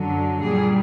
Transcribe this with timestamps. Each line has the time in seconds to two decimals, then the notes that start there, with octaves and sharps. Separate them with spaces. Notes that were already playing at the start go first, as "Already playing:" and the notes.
Already playing: F#2 D3 F#3
0.42 A#2 G3 G#4